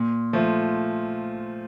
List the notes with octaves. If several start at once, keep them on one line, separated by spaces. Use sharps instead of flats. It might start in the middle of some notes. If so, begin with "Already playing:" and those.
Already playing: A#2
F3 A3